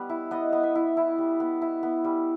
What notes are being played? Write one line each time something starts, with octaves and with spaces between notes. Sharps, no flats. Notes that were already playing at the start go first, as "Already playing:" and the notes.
Already playing: G3 B3
E4
B3 D#5
B3
E5
E4
E4
G3
B3
E4
B3
G3